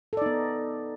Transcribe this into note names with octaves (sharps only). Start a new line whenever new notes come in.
B3 D#4 A4 D5